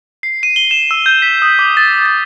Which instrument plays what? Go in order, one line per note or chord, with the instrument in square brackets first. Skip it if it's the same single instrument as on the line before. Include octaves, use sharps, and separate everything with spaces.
[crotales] C7
D#7
G7
E7
E6
G6
B6
D#6
D6
A6
A6